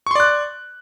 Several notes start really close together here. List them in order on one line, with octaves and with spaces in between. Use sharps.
C#6 C6 D5 F#6